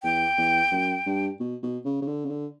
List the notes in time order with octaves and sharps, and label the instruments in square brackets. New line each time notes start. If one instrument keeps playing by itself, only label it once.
[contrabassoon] E2 [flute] G5
[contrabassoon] E2
F#2
G2
B2
B2
C#3
C#3
D3
C#3
D3